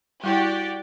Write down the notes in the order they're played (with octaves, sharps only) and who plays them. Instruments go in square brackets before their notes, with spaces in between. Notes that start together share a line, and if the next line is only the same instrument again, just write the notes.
[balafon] G3 E4 G5 [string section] F#4 G4 D5